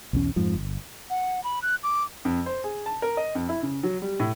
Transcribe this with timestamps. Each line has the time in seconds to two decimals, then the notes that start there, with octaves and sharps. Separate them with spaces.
0.13 B1 E2 C#4
0.36 F2 G#2 F3
0.55 G1
1.10 F#5
1.44 B5
1.62 F#6
1.83 D6
2.25 F2
2.46 C5
2.64 G#4
2.86 A5
3.02 A#4
3.17 D#5
3.35 F2
3.49 E4
3.63 C#3
3.83 F#3
4.02 G3
4.20 A2